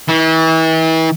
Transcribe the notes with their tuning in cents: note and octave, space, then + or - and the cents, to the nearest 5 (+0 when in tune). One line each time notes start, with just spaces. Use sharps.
E3 -35